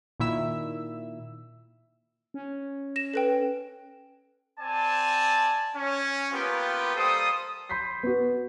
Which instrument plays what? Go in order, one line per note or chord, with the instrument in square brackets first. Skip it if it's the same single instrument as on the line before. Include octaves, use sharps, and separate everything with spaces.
[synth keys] A#2 D#3 E4 E5 E6
[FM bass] C#4
[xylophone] A#6 E7
A4 B4 G5
[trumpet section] C4 D5 G#5 A5
C#4
A#3 B3 F4 G4 B4 G5
G3 A#3 A4 C5 D#6
[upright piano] B5 C6 G6 B6 C7
B3 F#4